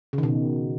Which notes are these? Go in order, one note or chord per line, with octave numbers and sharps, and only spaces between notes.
C#3
D#3
B2